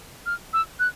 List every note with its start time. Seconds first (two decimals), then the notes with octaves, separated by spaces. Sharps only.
0.26 F6
0.53 E6
0.80 F#6